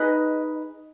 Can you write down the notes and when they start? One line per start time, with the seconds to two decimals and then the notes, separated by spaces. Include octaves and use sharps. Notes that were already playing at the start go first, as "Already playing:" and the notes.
Already playing: D#4 G#4 B4 D#5